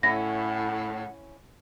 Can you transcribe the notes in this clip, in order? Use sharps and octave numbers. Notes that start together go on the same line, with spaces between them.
A2 C#4 E4 F#5 A#6